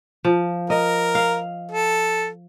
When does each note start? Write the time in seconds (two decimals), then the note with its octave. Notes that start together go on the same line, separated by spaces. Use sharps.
0.25 F3
0.70 A#4 D#5
1.15 F5
1.71 A4